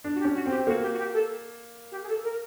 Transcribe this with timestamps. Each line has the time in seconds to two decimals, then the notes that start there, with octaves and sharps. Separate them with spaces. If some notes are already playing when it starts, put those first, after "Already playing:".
0.04 D4
0.15 F#4
0.20 G4
0.24 C#4
0.35 F#4
0.46 C4 G4
0.67 A#3 F#4
0.82 G4
0.93 F#4
0.98 G4
1.14 A4
1.92 G4
2.03 G#4
2.09 A4
2.24 A#4